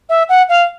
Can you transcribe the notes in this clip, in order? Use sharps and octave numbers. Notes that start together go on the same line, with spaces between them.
E5
F#5
F5